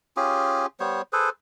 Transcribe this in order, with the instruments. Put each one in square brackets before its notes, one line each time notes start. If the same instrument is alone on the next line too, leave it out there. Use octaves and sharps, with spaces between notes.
[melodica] C#4 F4 G4 G#4
G3 B3 C5 C#5
G#4 A4 B4 C5